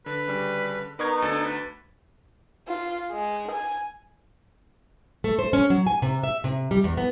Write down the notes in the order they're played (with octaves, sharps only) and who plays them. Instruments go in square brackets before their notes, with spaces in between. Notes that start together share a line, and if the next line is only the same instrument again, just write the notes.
[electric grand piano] D3 [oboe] B4
[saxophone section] C#3 G3
[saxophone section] B3 D#4 [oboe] A#4 [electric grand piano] B4 C#6 G#6
[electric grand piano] D2 D4 A6 [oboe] A4
[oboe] B4
[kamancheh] F4
G#3
G#5
[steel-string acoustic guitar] A3
C5
C#4
F#3
G#5
C3
E5
C3
G3
E2
B3